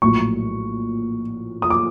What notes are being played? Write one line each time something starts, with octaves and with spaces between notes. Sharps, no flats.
A#1 A2 F#3 A3 C#6
D#6
D6